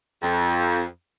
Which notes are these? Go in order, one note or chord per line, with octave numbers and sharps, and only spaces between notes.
F2